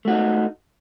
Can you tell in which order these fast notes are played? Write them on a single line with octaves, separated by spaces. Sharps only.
A3 F#4 D#4